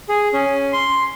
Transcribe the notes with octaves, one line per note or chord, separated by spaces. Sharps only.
G#4
C#4
C6